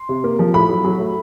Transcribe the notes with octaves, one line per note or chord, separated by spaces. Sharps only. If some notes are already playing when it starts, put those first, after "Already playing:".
Already playing: C6
C3
A#3
F3
A2 B5
F#3
F#3
A3